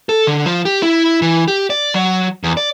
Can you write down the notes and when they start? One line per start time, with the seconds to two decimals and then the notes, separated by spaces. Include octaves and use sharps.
0.09 A4
0.27 D3
0.46 F3
0.65 G4
0.83 E4
1.22 E3
1.48 G4
1.70 D5
1.94 F#3
2.44 E2
2.57 D5